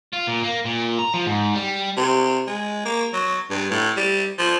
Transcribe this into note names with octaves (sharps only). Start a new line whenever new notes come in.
F4
A#2
A#3
A#2
A#5
F3
G#2
G3
C3
G#3
A#3
F#3
G2
A2
G3
F3